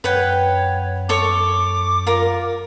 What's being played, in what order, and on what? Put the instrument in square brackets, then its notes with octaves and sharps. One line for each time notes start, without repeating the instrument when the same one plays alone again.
[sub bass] F#2 [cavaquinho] B4 F#5 G5 [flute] C#5
[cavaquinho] A4 C#5 C#6 [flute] D6
[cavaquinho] F4 A#4